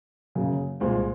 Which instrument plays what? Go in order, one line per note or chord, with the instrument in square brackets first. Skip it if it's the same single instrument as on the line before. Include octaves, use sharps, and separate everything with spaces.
[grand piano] F#2 C#3 F#3 A#3
C2 A#2 G#3 C4